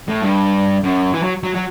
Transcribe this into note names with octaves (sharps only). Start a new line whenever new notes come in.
A2
G2
F#2
E3
F#3
F#3
F#3